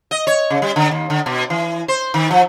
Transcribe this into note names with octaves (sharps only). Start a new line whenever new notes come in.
D#5
C#5
C#3
G3
D3
D#2
D3
B2
E3
C5
D#3
F3